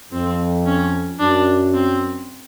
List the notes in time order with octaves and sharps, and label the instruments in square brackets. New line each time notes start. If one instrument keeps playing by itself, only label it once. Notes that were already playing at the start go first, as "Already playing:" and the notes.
[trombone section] F2 [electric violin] C4
[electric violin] C#4
[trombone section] F#2 [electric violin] D4
[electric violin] C4